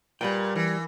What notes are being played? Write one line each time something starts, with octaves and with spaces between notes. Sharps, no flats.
A#2 G3 B4 G5
E3